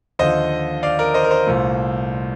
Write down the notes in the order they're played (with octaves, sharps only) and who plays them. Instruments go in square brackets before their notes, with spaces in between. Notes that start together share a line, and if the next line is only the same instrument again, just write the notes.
[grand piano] D#2 D3 F3 C5 D#5
D5 F5
A#4 D5
C5 D#5
A#4
C5
C2 A#2 A3